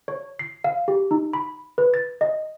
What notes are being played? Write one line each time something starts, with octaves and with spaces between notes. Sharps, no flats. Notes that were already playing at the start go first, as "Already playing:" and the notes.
C#5
C7
F5
G4
D#4
B5
B4
A6
D#5